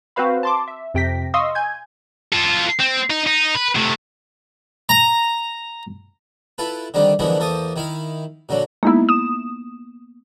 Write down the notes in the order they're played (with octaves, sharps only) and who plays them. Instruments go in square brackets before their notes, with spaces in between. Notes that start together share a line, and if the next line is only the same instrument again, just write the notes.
[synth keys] C4 F#4 B4 C5 F5 B5
A5 C6 D6
E5
F2 C3 G5 A#6 B6
D#5 F5 C6 C#6 D#6 E6
G#5 G6 G#6
[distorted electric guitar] F4 A4
C4
D#4
D#4
B4
C3 A3
[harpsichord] A#5
E4 F4 A4 B4
D3 D#3 G3 C4 D4
D3 E3 F3 G#3 A#3 B3
E2 A#3 A4 C5 D#6
D#3 E4 F5
A#2 D3 F#3
[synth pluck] G#3 D#4 E4 [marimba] A#3 B3
[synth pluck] D#6 E7